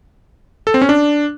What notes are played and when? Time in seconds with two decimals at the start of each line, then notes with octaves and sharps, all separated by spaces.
0.67 A4
0.74 C4
0.82 C#4
0.89 D4